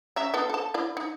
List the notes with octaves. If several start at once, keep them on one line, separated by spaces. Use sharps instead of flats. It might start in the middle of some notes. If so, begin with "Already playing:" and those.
C#4 E5 A#5
B3 F4 A4
A4 A5
E4 D5
D#4